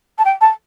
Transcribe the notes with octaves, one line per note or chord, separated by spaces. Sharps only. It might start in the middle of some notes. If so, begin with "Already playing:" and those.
A5
G5
A5